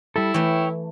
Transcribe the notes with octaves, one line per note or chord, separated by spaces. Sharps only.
G3 E4 A4
E3 A3 C#5 G5